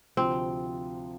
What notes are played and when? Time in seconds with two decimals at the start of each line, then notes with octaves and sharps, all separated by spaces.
0.17 D2 C3 F3 C4